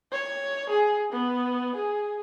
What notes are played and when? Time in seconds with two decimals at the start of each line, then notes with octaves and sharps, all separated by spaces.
0.12 C#5
0.69 G#4
1.12 B3
1.76 G#4